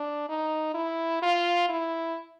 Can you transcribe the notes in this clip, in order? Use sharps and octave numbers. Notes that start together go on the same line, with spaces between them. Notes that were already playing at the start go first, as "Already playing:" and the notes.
Already playing: D4
D#4
E4
F4
E4